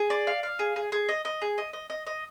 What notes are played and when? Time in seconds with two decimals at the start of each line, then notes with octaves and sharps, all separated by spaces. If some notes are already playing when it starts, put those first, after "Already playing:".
Already playing: G#4
0.10 D5
0.27 F5
0.43 F5
0.59 G#4
0.76 G#4
0.92 G#4
1.09 D#5
1.25 D#5
1.42 G#4
1.58 D#5
1.73 D#5
1.90 D#5
2.07 D#5